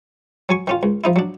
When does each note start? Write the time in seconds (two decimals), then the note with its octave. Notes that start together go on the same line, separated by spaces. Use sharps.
0.49 F#3 G#5 C#6
0.67 D#3 C#4 F4
0.83 C#2
1.04 F3 D#4 E4
1.16 F#3 D4